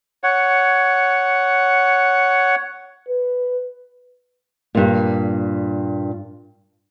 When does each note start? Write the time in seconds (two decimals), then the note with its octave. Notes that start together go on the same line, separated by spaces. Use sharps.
0.24 C#5 F#5
3.09 B4
4.75 G2 A#2